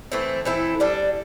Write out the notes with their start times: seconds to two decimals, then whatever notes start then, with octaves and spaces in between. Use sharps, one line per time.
0.12 E3 A3 C4
0.45 E3 C4 E4 A4
0.80 G3 D4 A4